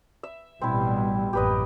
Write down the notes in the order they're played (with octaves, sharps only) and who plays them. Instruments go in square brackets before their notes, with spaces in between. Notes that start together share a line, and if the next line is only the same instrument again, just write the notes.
[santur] E5
[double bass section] A1 B2 G3 [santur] C4 E4
[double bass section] A1 F#2 A#3 [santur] G4 B4 D#5